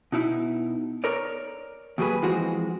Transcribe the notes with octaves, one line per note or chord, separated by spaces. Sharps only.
B2 D#4 E4
A#4 C#5 D5
D#2 F#3 G3 G4 G#4 B4
E3 F3 G#3 C4 F#4